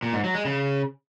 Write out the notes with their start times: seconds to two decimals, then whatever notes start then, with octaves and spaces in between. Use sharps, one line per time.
0.03 A#2
0.13 G#2
0.24 F#3
0.34 G#3
0.45 C#3